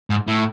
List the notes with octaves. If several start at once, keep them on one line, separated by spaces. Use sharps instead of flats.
G#2
A2